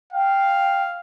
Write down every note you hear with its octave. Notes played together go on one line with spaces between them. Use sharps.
F5 G5